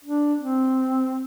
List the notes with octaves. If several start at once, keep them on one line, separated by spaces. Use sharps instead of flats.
D4
C4